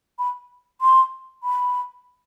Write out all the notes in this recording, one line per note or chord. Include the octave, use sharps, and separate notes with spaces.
B5
C6
B5